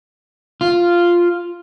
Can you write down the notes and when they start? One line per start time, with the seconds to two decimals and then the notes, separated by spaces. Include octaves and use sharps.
0.61 F4